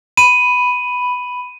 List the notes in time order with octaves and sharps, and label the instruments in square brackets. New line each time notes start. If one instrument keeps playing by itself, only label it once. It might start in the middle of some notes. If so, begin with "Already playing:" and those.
[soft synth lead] B5 [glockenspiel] D#7